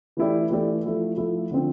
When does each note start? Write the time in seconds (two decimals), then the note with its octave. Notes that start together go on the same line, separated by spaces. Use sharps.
0.17 E3 A3 E4 G4 D5
0.51 E3 A3 E4 G4 D5
0.84 F3 A3 E4
1.17 F3 A3 E4
1.51 D3 F3 C4